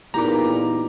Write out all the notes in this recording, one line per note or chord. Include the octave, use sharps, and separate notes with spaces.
E2 A#2 D#4 G4 B4 A#5 D6